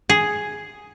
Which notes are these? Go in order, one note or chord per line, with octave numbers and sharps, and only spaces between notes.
G#4